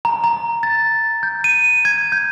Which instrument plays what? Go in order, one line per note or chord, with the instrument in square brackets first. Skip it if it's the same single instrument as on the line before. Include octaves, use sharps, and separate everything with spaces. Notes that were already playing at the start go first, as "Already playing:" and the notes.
[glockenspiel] A#5
A#5
A6
G6
D#7
G#6
G6